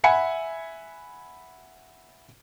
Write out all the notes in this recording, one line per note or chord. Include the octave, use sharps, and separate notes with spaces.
E5 F#5 G#5 B5 C#7